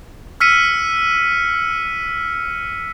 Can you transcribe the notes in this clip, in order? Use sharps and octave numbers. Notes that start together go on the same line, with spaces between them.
E6 F6 B6 C#7 D#7